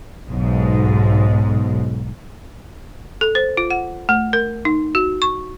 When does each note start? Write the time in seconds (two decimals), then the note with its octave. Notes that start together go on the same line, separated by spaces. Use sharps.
0.28 B1 G#2
3.21 A4
3.35 C5
3.57 F4
3.70 F#5
4.09 A3
4.33 A#4
4.65 D#4
4.95 F#4
5.22 C#6